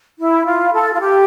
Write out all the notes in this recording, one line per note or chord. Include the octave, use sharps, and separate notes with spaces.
E4
F4
A4
F4
G4